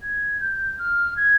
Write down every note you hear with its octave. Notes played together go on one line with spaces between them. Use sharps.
G#6
G6
F6
G#6